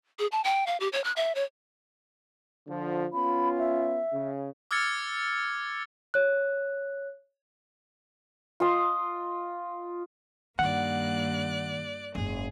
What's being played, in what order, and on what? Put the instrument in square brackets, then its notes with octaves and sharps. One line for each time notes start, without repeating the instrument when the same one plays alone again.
[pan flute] G#4
A5
G5
F5
G4
C#5
F#6
E5
C#5
[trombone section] D3 F3
[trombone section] B3 C#4 F4 [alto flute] B5
[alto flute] E5
[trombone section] C#3
[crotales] D6 E6 F6 G#6 A6 C#7
[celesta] C#5 F#6
[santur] F4 D#5 C6 D#6
[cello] G2 A#3 [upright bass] D#3 [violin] D5 F#6 [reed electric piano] F#5
[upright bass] F#1 G#2 [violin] G#4